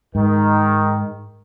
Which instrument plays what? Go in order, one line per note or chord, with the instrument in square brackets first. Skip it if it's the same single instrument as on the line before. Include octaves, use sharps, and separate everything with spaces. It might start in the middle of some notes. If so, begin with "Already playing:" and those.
[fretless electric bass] G#2 [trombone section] D#3